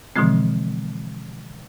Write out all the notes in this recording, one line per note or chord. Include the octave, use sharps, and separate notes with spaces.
B2 D3 E3 F3 G#3 C4